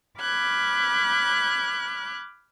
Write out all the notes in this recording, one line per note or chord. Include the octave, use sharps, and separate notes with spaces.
B5 D6 F6 F#6 G#6